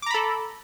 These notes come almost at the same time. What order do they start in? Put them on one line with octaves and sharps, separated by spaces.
D6 A#5 B5 A4